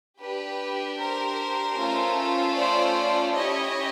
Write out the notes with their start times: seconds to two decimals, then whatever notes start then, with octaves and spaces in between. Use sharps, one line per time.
0.21 D4 G4 B4
0.99 A#4 C5
1.77 A3 C#4 F4 A4
2.56 C5 D5
3.34 C#4 E4 G4 C#5 D#5